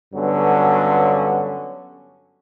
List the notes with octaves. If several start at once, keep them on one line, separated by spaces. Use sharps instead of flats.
G2 D3 F#3 B3 C#4